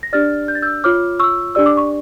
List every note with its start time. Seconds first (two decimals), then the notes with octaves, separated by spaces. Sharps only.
0.03 A#6
0.13 D4 G4 D5 F6 A6
0.48 G6
0.55 A6
0.62 E6 G6
0.84 F4 C#5 D6 F6
1.20 C#6 E6
1.55 D4 G4 D5 E6
1.66 D6
1.77 C#6